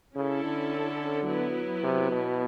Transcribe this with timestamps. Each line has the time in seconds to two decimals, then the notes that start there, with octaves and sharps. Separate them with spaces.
0.16 C#3 C#4 E4 A4
0.44 D3
1.28 F#3 B3 E4
1.84 C3
2.12 B2